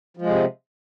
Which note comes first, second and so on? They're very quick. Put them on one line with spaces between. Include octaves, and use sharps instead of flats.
F3 G#3 C3